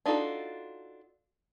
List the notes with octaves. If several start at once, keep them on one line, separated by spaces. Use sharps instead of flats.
D4 D#4 F4 F#4 A4